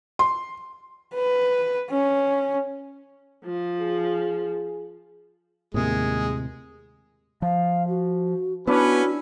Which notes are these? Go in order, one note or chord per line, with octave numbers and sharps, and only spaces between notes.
C6
B4
C#4
F3
G#4
D#2 A2 C3 G#3 G#4
F3 F5
F#4
B3 C#4 D4 E4 F#4 B4 E5